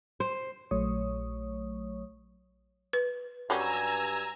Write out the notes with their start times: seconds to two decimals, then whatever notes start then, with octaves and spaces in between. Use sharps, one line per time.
0.20 C5
0.71 A#1 F#3 A3 C#5 C#6 D#6
2.93 B4
3.50 G2 F#3 G3 C#4 G#5 A#5 E6 G#6